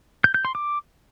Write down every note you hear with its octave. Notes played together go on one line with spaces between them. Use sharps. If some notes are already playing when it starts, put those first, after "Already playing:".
G6
G6
C6
D6